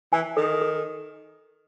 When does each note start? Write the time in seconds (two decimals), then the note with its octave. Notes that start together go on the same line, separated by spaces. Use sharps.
0.13 E3 G#5
0.37 D#3 A4
0.61 A4